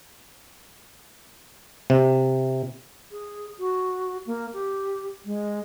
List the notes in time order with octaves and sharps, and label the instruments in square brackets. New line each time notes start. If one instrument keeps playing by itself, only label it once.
[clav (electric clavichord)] C3
[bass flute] G#4
F#4
A#3
G4
G#3